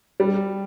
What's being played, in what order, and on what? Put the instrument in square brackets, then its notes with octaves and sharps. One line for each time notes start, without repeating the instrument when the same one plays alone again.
[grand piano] G3